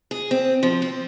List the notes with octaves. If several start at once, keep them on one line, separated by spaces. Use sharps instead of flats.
G#4
C4
F3
C4